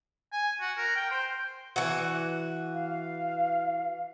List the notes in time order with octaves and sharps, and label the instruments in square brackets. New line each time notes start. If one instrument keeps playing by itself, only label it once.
[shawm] G#5
F#4
A#4
G5
C5
[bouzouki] E3 F#4
[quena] F5